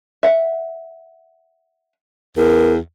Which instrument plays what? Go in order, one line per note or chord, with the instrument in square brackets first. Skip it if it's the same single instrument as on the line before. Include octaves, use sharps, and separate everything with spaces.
[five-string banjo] E5 F#5
[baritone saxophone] E2 [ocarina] A#4